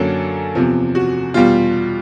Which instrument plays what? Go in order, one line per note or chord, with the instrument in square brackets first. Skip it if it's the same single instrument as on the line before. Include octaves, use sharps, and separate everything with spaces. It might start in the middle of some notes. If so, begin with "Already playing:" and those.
Already playing: [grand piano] F#2 D3 F#3 A#3 C#4 A4
E2 C3 F3
F#4
E2 B2 G3 F4